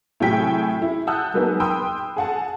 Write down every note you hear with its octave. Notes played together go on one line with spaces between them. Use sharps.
A2 C3 F#3 G#4 G5 B6
E4
F#5 A5 D#6 E6 F#6 G6
F#3 A#3 B3 D#4 F#4 G#4
G5 B5 C6 D#6 E6
G#4 F#5 A5